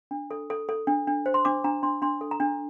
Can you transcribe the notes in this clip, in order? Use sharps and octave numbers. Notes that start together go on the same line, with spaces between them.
D4
A4
A4
A4
D4
D4
C5
C6
D4 D6
D4 A#5
D4 C6
D4 C6
A4
A#5
D4